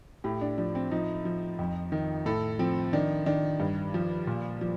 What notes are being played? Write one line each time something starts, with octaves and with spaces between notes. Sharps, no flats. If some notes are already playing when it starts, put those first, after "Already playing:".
A2 G4
D4
F3 D4
C4
F3 D#4
F3
F2
D#3
A2 A4
F3 C4
D#3 D4
D#3 D4
G2
F3
A#2
F3